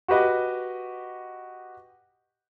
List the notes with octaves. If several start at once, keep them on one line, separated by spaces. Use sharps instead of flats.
F#4 G4 B4 D#5